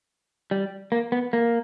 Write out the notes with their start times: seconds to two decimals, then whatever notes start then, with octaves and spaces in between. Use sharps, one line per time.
0.51 G3
0.92 A#3
1.12 B3
1.33 A#3